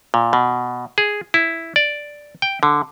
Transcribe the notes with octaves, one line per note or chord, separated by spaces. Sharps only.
A#2
B2
G#4
E4
D5
G5
D3